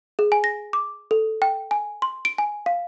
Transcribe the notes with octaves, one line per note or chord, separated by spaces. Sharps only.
G#4
G#5
A#6
D6
A4
G5
G#5
C6
D7
G#5
F5